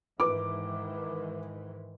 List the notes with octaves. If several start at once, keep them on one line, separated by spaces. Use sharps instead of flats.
G#2 D#3 E3 B4 D6